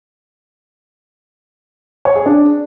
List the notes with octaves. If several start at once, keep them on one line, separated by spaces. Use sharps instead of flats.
C#5
G#4
D4